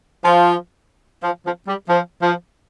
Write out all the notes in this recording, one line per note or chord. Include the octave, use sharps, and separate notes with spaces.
F3
F3
F3
G3
F3
F3